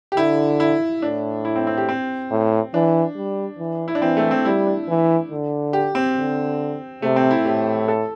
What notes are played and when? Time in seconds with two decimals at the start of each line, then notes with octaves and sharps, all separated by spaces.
0.12 G4
0.17 D3 E4
0.60 E4
1.02 A2 D4
1.45 E4
1.56 C4
1.67 C4
1.77 G4
1.89 C4
2.31 A2
2.74 E3 D4
3.17 G3
3.59 E3
3.88 E4
3.95 D4
4.02 E3 C4
4.17 A3
4.31 C4
4.45 G3 E4
4.67 D4
4.89 E3
5.31 D3
5.73 G4
5.95 C4
6.17 D3
7.02 C3 A3
7.16 C4
7.31 E4
7.45 A2 G4
7.88 A4